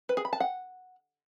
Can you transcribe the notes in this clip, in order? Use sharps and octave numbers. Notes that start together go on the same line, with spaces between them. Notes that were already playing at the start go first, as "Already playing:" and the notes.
B4
G#4
B5
A5
F#5